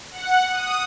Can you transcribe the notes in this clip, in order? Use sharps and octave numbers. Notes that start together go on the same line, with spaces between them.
F#5
D#6